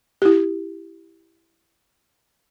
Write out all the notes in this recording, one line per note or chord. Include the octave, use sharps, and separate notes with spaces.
E4 G4